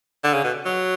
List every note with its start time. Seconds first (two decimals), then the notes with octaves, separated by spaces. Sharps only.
0.24 D3
0.34 C#3
0.44 B2
0.65 F#3